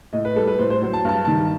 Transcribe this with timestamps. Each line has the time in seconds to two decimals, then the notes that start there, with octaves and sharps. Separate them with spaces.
0.13 A2 D#5
0.25 B4
0.36 G3 A4
0.47 B4
0.59 A2 C5
0.70 C5
0.81 F#3 C5
0.93 A5
1.05 G2 A5
1.25 D#3 G3 A5